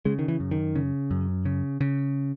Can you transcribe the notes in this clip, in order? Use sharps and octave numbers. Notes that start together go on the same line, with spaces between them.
C#3 G#3
D#3
E3
F#2
D#3
C#3
F#2
C#3
C#3